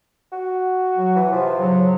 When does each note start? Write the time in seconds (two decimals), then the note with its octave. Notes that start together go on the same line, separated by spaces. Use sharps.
0.32 F#4
0.97 F#3
1.16 E3
1.32 C3 F3
1.59 G#2 C#3 F#3